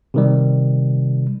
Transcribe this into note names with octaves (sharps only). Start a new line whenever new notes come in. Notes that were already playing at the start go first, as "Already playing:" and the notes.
C3 D#3 G3